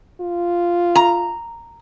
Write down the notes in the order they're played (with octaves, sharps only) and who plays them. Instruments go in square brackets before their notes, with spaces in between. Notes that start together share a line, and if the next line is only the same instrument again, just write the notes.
[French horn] F4
[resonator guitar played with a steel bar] A#5